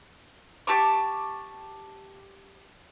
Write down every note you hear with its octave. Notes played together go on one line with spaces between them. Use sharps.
G4 A5 C#6 D6